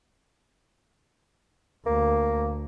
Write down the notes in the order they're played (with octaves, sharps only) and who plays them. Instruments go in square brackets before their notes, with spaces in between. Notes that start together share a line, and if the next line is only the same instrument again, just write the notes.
[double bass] D2 [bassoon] A#3